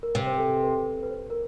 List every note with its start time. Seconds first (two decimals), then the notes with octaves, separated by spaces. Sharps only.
0.03 A#4
0.15 C3 B4
0.27 C5
0.38 A4
0.63 B4
1.03 B4
1.10 C5
1.30 A#4